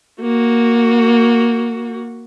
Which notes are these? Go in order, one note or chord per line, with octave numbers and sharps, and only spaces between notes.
A#3 F#4